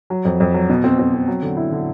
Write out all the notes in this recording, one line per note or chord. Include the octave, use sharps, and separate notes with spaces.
F#3
F2
F2
F#3
B2
C4
C4
C4
F#3
D3
E4
D3